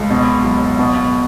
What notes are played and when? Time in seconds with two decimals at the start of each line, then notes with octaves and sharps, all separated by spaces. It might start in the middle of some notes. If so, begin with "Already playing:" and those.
Already playing: C#2
0.10 B2
0.44 F#1
0.79 B2